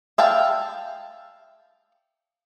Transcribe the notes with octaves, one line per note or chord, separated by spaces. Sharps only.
E5 F5 G5 A5